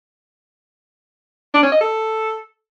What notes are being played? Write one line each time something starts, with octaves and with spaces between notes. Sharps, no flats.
D4
C#4
D#5
A4